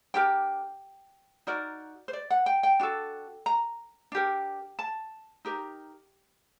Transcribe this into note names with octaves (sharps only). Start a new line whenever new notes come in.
D4 G4 A#4 G5
D#4 F#4 A#4 D5
C5
D5
F#5
G5
G5
D4 F#4 A4
A#5
D4 G4 A#4
A5
D#4 G4 A#4